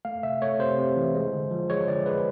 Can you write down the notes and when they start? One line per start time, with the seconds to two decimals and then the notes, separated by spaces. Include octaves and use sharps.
0.05 A3 F5
0.23 C3 E5
0.41 A3 C#5
0.59 C3 C5
0.78 C3
0.96 E3
1.14 G#3
1.33 D3
1.51 F3
1.70 G#3 C#5
1.87 D3 D5
2.06 G#3 B4